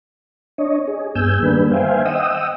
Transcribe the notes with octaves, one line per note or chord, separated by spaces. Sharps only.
D4 C#5 D#5
G#4
G2 B3 G#4 G#5 E6 G6
D#3 G3 A#3 B3 D4 B4
C5 E5 F5 G5 G#5
D#5 F#5 G5 D#6 E6